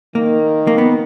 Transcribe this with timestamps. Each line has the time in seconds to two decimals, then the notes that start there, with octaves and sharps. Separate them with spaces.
0.15 D#3 A#3
0.67 A#3
0.78 B3